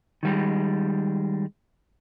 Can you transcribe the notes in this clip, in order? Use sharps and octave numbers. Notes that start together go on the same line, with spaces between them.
D#3 G3 G#3